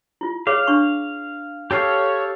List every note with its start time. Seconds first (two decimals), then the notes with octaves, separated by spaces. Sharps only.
0.21 E4 F4
0.47 G#4 C#5 F5 D6
0.67 D4 C#6
1.71 G4 A4 C#5 F5